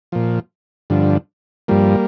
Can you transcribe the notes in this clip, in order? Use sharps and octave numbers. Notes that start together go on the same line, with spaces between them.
A#2 F3
G2 D3 F3
G2 F3 G3 A#3